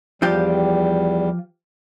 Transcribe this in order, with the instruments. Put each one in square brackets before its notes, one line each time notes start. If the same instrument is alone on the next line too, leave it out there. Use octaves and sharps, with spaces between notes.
[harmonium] E2 G3 [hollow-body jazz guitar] F3 F4 G4